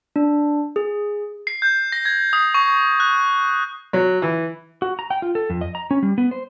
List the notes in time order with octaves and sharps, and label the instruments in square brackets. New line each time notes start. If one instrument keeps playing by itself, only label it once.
[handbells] D4
G#4
[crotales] C7
G6
A#6
G#6
D#6
C#6
F#6
[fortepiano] F#3
E3
[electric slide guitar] F#4
A#5
G5
F4
A4
F2
D#5
A#5
C#4
G3
B3
C5